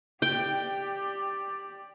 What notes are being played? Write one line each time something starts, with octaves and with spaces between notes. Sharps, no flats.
G4 D5 G5